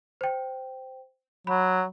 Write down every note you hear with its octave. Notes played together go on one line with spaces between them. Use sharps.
C5 G5
F#3 B5